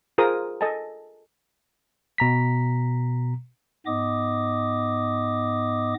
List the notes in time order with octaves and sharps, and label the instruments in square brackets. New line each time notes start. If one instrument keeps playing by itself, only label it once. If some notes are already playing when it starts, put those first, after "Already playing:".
[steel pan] F4 G#4 A#4 C5 A#5 D#6
A4 D#5 G#5 A5
[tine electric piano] B2 A#5 B6
[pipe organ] G#2 B3 D#5 D6 D#6